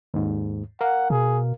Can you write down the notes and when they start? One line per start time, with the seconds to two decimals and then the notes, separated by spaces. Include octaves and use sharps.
0.14 D#2 G#2
0.81 A#4 F5 F#5
1.10 B2 G#4